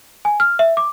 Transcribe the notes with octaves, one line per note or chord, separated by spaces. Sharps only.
G#5
F6
E5
D6